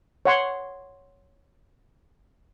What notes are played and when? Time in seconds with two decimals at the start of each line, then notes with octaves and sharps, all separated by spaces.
0.25 C#5 F#5 C6